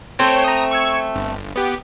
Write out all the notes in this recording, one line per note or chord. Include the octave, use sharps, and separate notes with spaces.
A3 C4 C5 C#5 G5
A#5 D#6
C#6 E6 G#6
G1
B3 G4